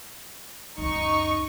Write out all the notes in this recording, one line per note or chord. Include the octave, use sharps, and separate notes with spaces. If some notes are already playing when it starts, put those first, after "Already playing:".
C#2 F#2 D#4 C#6